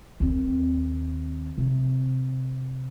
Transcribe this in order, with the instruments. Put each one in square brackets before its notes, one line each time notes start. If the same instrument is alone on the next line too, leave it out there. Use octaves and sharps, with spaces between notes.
[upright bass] D#2 C4
C3